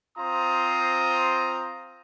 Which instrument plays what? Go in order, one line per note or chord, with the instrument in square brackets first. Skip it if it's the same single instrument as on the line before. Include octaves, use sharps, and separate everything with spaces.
[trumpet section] C4 F4 C5 A#5 D#6